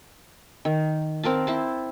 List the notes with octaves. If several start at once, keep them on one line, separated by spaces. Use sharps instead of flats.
D#3
C4 A#4 F5 A5
E4 C5 A5